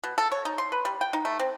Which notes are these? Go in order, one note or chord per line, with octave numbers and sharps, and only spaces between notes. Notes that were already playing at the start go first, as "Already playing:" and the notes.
B2
A4
C#5
D#4
C6
B4
G3
G5
D#4
A3
C4